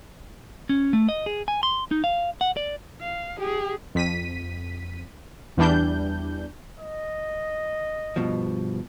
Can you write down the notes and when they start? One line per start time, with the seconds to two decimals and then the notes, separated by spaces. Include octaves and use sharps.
0.69 C#4
0.93 A3
1.09 D#5
1.26 G#4
1.48 G#5
1.63 C6
1.91 D#4
2.04 F5
2.41 F#5
2.57 D5
3.01 F5
3.39 G4 G#4
3.95 F2 B6 D#7
5.57 E2 E3 G3 D4 G6
6.79 D#5
8.16 G2 B2 F3